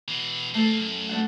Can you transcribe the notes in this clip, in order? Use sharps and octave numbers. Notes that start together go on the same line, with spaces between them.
B2 E3
C2 A3 A#3 A4
F#2
A3 D4 F#5